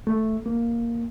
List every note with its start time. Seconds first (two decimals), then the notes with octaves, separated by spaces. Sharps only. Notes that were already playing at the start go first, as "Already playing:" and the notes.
0.07 A3
0.46 A#3